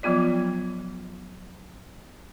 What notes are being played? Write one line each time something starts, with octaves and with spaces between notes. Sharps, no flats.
F3 F#3 B3 F4 D5